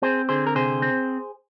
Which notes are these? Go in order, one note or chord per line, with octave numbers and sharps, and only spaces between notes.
C4 G#4 C5
D3 G#4 C5
A#4
C3 G#4 C5
C4